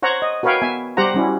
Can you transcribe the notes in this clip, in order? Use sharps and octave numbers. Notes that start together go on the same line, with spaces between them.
C5 C#5 F#5 A#5
D#5
F#4 A#4 B4 C#5 F5 G5
B3 E5 G#5
G3 G4 C5 F#5 A#5
G3 C#4 E4 F#4